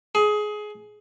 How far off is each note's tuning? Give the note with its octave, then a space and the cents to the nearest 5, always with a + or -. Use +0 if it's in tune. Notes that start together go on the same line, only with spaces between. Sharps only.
G#4 +20